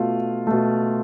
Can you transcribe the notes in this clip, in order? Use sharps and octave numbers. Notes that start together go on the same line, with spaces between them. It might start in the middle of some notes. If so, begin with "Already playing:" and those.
Already playing: B2 A3 F4
B2 A3